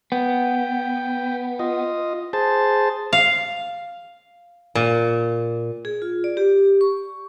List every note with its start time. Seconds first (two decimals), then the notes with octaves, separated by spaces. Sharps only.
0.12 B3 G5
1.59 F4 D#5
2.33 G#4 C5 A5
3.13 F5
4.75 A#2
5.85 G#4
6.02 F4
6.24 D5
6.37 G4
6.81 C#6